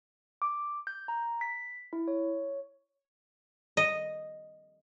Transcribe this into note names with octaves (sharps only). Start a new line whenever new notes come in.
D6
G6
A#5
B6
E4
C#5
D#5